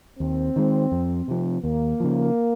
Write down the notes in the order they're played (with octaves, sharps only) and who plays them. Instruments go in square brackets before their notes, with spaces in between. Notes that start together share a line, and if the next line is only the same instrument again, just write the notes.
[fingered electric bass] D#2 [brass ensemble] C4
[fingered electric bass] D#3 G#3
F2
C3 F3
[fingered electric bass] D#2 [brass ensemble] A#3
[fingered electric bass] C#3 F3